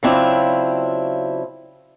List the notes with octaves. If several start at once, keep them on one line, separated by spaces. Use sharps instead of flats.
C#3 F#3 C4 D4 E4 F4